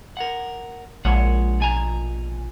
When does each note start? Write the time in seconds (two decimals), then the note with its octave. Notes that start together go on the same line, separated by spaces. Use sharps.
0.17 A#4 F#5
1.05 A#1 G#3 C#5 F#5
1.60 B2 G#5 A#5